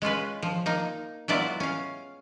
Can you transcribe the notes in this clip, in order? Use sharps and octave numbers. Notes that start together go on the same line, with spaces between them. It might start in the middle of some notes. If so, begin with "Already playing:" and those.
G#3 C#4 F4 B4
F3
A#3 D#4
F#3 G#3 B3 E4 F4 D5
C#4 F5